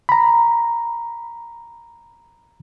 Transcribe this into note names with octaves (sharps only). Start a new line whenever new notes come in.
A#5 B5